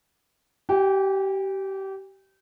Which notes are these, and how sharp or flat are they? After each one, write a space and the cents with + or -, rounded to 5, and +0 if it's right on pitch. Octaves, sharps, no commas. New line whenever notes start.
G4 -25 G5 +40